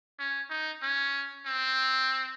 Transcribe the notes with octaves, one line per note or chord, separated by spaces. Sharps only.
C#4
D#4
C#4
C4